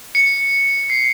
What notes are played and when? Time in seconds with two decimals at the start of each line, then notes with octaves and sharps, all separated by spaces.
0.15 C#7
0.90 C7